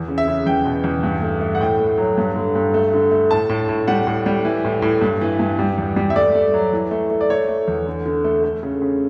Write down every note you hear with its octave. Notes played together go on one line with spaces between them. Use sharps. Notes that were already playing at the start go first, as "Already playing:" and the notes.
Already playing: E2
C#3
E5
C#3
E2 G5
B2
E2
G2
A3
A3
F#5
A2 G5
A3
F#3
G2
D3
G2
A3
D3
A3
A2 A5
A2
A2
G3 F#5
A2
G3
E3
A2
A2
G2
E3
G2
G3
E2
G3
E5
A3 D5
A3
F#3
E3
A3
A3
D5
A3 C#5
A3
E2
D3
D3
A3
A3
C#3
C#3